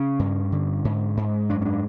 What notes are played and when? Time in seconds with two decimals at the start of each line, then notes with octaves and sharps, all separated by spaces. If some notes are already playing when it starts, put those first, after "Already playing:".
Already playing: C#3 C#4
0.19 G2
0.52 D3
0.85 G#2
1.17 G#2
1.50 F#2 D4
1.62 C#4
1.65 D4